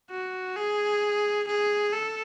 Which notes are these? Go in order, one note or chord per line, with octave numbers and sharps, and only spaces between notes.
F#4
G#4
G#4
A4